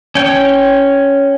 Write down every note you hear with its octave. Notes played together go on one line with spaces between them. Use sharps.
C#4 G5